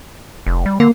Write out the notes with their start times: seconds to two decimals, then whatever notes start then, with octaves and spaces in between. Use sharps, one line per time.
0.46 F1
0.66 G3
0.80 D3 A#3